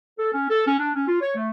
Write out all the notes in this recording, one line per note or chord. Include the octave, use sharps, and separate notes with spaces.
A4
C#4
A4
C#4
D4
C#4
F4
C#5
A3